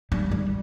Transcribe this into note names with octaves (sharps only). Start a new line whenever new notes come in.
G3
G3